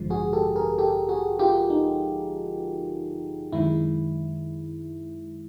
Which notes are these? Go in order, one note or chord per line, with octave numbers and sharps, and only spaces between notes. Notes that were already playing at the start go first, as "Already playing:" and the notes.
Already playing: A1 G2 D3 F3 G#3
F#4 G#4
G4 A4
G#4 A#4
G4 A4
F#4 G#4
F4 G4
D#4
F#2 D#3 G#3 E4